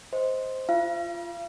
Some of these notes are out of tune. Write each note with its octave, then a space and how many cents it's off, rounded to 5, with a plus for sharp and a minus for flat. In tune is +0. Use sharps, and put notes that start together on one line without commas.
C5 +0 D#5 +15
F4 -15 F5 -40